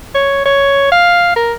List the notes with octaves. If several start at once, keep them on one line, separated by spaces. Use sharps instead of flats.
C#5
C#5
F5
A#4